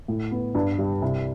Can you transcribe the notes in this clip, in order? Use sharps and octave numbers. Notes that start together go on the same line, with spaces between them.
A2
B3
G2
G3
C2